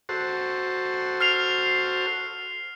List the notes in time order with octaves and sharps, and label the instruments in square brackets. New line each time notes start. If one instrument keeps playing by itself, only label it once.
[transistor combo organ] F#4 A4 C5
[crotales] F6 C7 F7